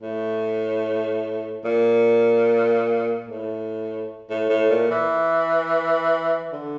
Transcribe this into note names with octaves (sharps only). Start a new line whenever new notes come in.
A2
A#2
A2
A2
A2
A#2
E3
D3